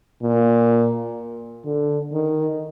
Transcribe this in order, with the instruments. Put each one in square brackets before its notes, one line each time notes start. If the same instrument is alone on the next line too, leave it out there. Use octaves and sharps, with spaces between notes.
[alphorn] A#2
D3
D#3